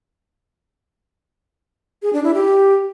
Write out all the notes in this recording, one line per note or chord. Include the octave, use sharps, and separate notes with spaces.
G#4
D4
E4
G4